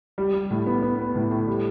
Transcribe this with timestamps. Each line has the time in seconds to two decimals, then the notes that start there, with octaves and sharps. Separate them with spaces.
0.18 G3
0.34 G3
0.50 A2
0.66 B3
0.82 B3
0.99 B3
1.15 A2
1.31 A2
1.47 G3